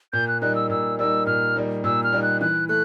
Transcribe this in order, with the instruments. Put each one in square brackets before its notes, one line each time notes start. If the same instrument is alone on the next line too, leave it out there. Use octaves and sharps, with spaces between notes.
[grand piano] A#2 [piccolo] G6
[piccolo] F#6
[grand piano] G3 A#3 D#4 [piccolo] F#6
[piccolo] E6
[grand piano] A#2 [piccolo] E6
[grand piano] G3 A#3 D#4 [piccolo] E6
[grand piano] A#2 [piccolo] F6
[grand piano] G3 A#3 D#4
[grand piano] A#2 [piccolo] E6
[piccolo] F6
[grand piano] G3 A#3 D#4
[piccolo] F#6
[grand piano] E3 [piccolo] F#6
[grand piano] A3 [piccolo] F#6